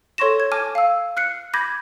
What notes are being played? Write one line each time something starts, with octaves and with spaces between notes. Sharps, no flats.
A4 C#5 C6 C#6 A#6 E7
G#6
G#5 A5 D6 F6 D#7
F5 E6
F6 F#6 C7 C#7
B5 D6 G6 G#6 A#6 B6